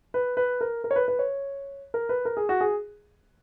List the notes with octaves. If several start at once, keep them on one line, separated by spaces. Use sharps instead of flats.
B4
B4
A#4
A#4
C#5
B4
B4
C#5
A#4
B4
A#4
G#4
F#4
G#4